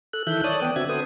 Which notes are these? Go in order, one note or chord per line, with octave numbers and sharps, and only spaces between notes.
A4 F#6
D#3 E3 A4 E5 F#6 G6
C#5 D5 A5 D#6 F#6
B3 G5
D3 C4 F#4 E5 G#6
A4 B4 C5 D#6